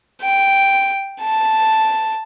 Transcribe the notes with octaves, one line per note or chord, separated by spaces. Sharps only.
G5
A5